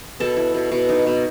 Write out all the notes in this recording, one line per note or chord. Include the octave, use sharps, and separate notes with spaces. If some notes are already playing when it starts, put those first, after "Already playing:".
B2 A4
E4
B2
B2
D#4
B2